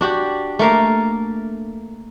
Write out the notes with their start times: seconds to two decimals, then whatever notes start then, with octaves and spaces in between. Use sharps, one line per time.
0.01 D4 F#4 G4
0.59 A3 A#3 A#4 F5